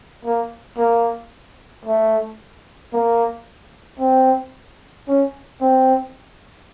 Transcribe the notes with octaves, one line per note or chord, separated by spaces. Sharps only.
A#3
A#3
A3
A#3
C4
C#4
C4